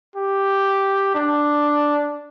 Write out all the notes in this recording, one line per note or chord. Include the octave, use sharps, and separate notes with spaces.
G4
D4